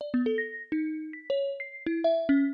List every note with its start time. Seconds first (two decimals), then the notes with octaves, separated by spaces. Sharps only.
0.01 D5
0.14 B3
0.26 A4
0.38 A#6
0.72 D#4
1.13 B6
1.30 C#5
1.60 C7
1.86 E4
2.04 E5
2.29 C#4